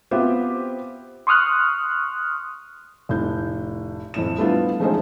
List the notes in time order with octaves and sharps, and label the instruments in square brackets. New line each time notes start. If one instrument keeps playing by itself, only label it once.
[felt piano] B3 C4 F4 G4 C5 E5
[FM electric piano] C6 C#6 D#6 F6 F#6
[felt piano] F1 A2 G6
F2 A2 E7
G3 A3 B3 D4 E4 F4
F3 G#3 A3 C#4 D#4 C5